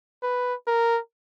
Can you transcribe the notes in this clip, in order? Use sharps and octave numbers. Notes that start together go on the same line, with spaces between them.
B4
A#4